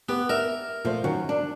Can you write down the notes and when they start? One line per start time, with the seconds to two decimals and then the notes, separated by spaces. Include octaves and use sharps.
0.09 B3 G4
0.29 A#4 E5
0.85 A#2 F3 A3 C5
1.04 F#2 D#3 C#4 F#4
1.29 D4